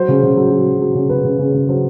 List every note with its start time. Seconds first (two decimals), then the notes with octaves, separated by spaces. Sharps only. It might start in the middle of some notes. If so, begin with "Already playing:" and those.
Already playing: F#3 C5
0.08 C#3
0.23 C#3
0.37 F#3
0.51 F#3
0.66 C#3
0.81 F#3
0.95 C#3
1.09 C#3 B4
1.25 C#3
1.39 C#3
1.54 C#3
1.69 F#3 C5